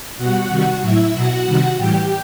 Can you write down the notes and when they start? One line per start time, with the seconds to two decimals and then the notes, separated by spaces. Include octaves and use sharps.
0.18 B2 G3 F#4 F#5
0.50 C3 D#3 G3
0.81 A2 F#3 E4 E5
1.13 B2 F#3 F#4 F#5
1.45 C3 D#3 G3
1.77 A2 E3 G3 G4 G5